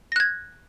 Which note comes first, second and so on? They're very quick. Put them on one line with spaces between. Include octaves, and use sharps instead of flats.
A#6 F#6 G#6